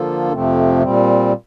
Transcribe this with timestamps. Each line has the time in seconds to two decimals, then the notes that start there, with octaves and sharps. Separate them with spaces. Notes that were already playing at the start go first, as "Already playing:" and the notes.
Already playing: D3 F3 A#3 F4 A4
0.32 F2 C3 F3 A3 C4
0.82 A#2 G3 C4